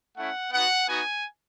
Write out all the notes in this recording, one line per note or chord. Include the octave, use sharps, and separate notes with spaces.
A3 C#4 E4 F#5
B3 D#4 F#4 F#5
B3 D#4 F#4 G#5